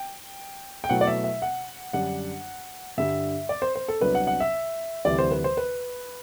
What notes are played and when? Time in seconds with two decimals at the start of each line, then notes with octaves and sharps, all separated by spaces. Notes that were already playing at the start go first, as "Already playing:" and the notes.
Already playing: G5
0.84 G5
0.89 B2 F#3 A3 E4 F#5
1.01 D5
1.07 E5
1.24 E5
1.42 F#5
1.93 F#2 D3 G3 D4 F#5
2.97 G2 D3 G3 E5
3.49 D5
3.62 C5
3.76 C5
3.88 A4
4.01 C2 C3 F#3 B3 D4 B4
4.15 F#5
4.27 F#5
4.40 E5
5.05 D2 C3 E3 G3 D5
5.18 C5
5.31 B4
5.44 C5
5.57 B4